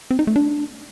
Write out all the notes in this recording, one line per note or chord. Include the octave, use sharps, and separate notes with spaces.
C4
D#4
A3
D4